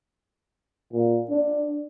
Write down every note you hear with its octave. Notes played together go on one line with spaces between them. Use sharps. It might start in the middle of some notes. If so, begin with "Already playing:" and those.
A#2
D4